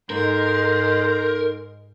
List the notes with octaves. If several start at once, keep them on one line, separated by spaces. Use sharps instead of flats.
G#2 G#3 D#4 A4 A#4 C5